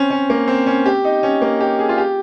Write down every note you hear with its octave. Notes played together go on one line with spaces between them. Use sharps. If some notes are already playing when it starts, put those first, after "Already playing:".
Already playing: C4 C#4
C#4
A#3
C4
C#4
G4
D#4
C#4
A#3
G4
G#4
F4
G4